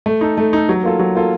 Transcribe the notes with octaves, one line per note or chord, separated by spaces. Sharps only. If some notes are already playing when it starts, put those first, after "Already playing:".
A3
D#4 A4
A3
D#4 A4
F#3
A#3 F4 A4
F#3
A#3 F4 A4